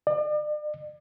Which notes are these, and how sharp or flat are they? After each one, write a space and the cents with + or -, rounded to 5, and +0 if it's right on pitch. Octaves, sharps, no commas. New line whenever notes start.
D5 +40